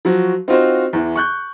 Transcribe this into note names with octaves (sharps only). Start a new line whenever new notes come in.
F3 F#3 F#4
C4 D#4 F4 F#4 C5
E2 E3
C#6 F#6 G6